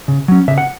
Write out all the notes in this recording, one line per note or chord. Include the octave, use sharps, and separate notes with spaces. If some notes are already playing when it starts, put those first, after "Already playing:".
C#3
F#3 C#4
C#3 E5
F#5